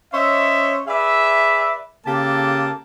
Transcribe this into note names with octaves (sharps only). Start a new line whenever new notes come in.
C#4 C5 C#5 D#5 E5
G#4 B4 D5 E5
C#3 A#3 G4 A4 A5